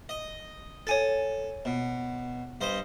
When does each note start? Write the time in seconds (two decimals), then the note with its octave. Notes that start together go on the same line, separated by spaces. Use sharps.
0.09 D#5
0.87 A4 C#5 G#5 A6
1.65 B2
2.61 G2 C5 D#5